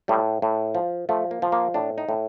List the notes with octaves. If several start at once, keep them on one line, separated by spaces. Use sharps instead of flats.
A2 G3
A2
F3
F3 A3
A#3
F3
A#3
A2 D4
D#4
A2